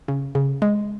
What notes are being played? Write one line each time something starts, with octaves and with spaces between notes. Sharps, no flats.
C#3
C#3
G#3